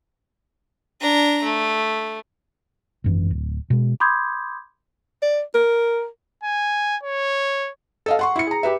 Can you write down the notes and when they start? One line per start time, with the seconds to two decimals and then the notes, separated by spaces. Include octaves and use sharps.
1.01 D4 A#5
1.44 A3
3.04 G#1 F#2 E3
3.30 D1
3.70 B2 G#3
4.00 B5 C6 D6 D#6 G6 G#6
5.22 D5
5.54 A#4
6.43 G#5
7.03 C#5
8.06 A4 D#5 F5
8.19 F#5 C6 C#6
8.36 E4 C#7
8.47 G#4 A#5
8.63 G4 B4 E5